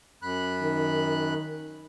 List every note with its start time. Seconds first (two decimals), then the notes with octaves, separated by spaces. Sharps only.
0.22 F#2 B5 F#6
0.62 D#3